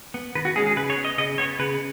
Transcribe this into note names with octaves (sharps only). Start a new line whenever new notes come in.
B3
D#3 B4
F#4
G#3 C#4 G#4
G#4
C#3 B4
C#5
B3
D#5
C#3 D#5
B3 C#5
C#3 B4